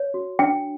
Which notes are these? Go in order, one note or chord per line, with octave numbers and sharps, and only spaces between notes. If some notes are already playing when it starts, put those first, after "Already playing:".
Already playing: C#5
F#4
D4 G5